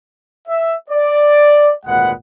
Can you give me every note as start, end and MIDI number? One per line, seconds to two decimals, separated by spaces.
0.48 0.75 76
0.90 1.72 74
1.86 2.12 32
1.86 2.12 38
1.86 2.12 46
1.86 2.12 56
1.86 2.12 71
1.86 2.12 78